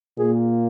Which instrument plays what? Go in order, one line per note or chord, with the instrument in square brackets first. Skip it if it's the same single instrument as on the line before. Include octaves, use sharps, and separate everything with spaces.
[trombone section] A#2 A#3 G#4